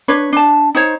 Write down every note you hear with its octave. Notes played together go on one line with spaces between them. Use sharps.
D4 B4 C#5
D4 A5
D#4 C5 C#5